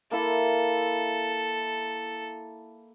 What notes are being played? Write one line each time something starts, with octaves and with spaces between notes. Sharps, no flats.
A#3 E4 A4